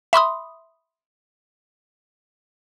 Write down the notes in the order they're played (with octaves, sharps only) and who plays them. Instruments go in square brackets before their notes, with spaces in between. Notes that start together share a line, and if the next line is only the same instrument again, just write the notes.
[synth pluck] E5 B5 C6 D#6